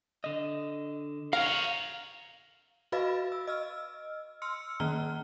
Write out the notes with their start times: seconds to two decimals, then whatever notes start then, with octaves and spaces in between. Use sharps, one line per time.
0.24 D3 D#5
1.33 A#4 C#5 F5
2.92 F#4 B4 D#5 F5 B5 A6
3.32 E6
3.47 D#5 E6 F6
4.42 C6 E6 F6 C#7
4.80 D#3 A#3 C#4 A#5 F6 G7